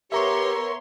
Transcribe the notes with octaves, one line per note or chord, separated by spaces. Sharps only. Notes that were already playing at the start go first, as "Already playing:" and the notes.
B3 G4 A#4 C#5 E5 A#5 C6 C#6